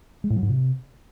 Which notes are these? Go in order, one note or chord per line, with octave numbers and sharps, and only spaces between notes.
G#3
A2
F#3
G#2
C3